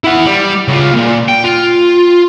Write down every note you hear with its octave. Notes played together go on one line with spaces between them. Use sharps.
E4 F#5
G3
C#3 F4
D2 A#2
G5
F4